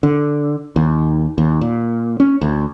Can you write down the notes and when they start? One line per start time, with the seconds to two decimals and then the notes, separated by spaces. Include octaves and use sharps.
0.03 D3
0.76 D#2
1.38 D#2
1.61 A#2
2.20 C#4
2.41 D2